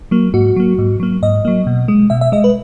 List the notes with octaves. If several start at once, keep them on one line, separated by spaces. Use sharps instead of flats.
F#3 A#3
G#2 F#4
F#3 A#3
G#2
F#3 A#3
G#2 D#5
F#3 A#3
B2
G#3
B2 E5
E5
G#3 D#5
B4